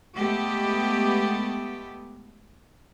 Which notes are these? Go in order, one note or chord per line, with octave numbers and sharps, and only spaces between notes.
G#3 A3 B3 G4